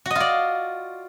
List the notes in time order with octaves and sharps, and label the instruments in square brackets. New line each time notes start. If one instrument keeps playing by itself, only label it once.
[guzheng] F#4
D#5
F4
D5